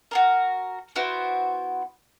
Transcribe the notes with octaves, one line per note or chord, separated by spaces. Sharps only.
F#4 G#4 A#4
B3 E4 F#4 C5